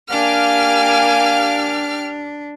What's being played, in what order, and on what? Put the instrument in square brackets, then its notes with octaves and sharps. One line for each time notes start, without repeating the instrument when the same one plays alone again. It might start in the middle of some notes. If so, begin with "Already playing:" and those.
[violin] A#3 G#5 [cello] D4 [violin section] G4 D6 F6 [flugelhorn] F5